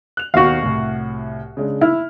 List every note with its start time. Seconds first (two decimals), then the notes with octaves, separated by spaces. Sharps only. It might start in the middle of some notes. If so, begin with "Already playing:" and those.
0.17 F#6 F7
0.34 D#2 B2 D#3 F#4 F5
0.62 C2 A2
1.57 C#3 G#3 D4
1.81 E4 F6